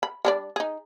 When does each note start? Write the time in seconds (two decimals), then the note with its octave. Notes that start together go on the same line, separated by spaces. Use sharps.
0.03 B5
0.25 G3 D4 D5
0.56 D#4 G#4